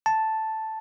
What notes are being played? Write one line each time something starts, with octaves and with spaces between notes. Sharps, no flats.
A5